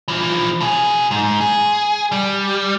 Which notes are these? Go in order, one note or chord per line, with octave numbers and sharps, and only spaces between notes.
E3 F3
B2 G#4
G#2
G#4
G3